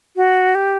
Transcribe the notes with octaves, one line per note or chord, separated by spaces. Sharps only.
F#4
G4